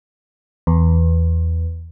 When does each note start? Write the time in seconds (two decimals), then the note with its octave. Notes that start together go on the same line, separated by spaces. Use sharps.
0.67 E2